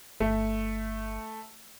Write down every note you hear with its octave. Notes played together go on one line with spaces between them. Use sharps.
G1 A3